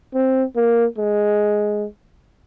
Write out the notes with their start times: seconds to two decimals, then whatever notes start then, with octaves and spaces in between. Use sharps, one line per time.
0.14 C4
0.56 A#3
0.98 G#3